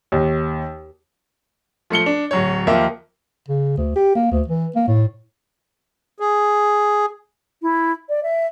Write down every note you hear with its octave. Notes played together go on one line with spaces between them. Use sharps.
D#2
F3 A3 C#7 G7
D4
D1 F#3 C#5
D#2 F3 A#3 E5
C#3
D2
G4
A#3
D2
E3
A#3
A2
G#4
E4
D5
E5